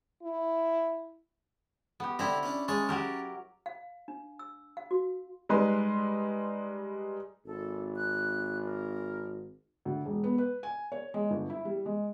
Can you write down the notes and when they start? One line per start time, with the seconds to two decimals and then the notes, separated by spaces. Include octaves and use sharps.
0.23 E4
2.00 B3 G4
2.19 D3 C4 D4 E4 A#5
2.43 C#4 D4
2.68 G#3 C#4 C#5 A5
2.89 F#3 G4 A#4
3.66 F5
4.08 D4
4.39 E6
4.77 F5
4.91 F#4
5.49 G3 G#3 D#4 B4 C6
7.46 G#1 A4
7.96 F#6
8.66 A#4
9.85 D2
10.05 E1
10.24 B3
10.38 B4
10.63 G#5
10.92 C#5
11.14 G#3
11.31 G1
11.50 E4
11.65 G3
11.86 G#3